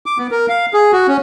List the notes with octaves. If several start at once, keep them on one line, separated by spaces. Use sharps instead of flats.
D6
B3
A#4
F5
G#4
F#4
C#4